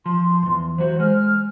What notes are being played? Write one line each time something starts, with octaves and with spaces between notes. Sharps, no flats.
F3 C6
E2 G2
E3 F#3 F#4 C5
G#3 F6